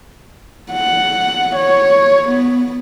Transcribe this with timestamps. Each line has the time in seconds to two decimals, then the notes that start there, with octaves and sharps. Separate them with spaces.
0.73 F#5
1.56 C#5
2.29 B3